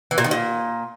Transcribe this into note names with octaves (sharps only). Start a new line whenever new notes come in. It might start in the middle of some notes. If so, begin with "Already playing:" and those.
E3
A#2
D#3
A#2